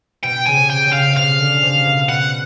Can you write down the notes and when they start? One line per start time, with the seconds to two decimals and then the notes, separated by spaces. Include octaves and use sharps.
0.23 B2 G5
0.46 C#3 G#5
0.55 C3
0.70 G5
0.86 C#3
0.92 F5
1.07 B2
1.16 C3 F5
1.39 D3
1.55 C#3
1.62 C3
1.85 B2
2.08 B2 F#5